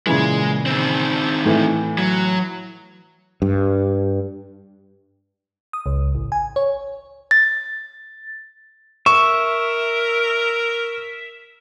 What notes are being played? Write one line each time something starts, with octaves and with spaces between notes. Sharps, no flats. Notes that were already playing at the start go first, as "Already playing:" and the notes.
A#2 C#3 E3 G#3
D#3 C4
A2 E3
F#3
G2
D#6
C#2
A1
G#5
C#5
A6
A#4 E5 C#6